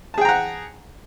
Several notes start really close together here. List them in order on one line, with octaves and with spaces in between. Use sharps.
A5 G#4 G5 A#5 F#5